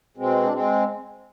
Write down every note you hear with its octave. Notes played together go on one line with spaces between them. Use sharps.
B2 G#3 C4
D4
G#3 C4